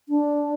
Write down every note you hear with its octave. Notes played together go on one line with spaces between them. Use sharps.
D4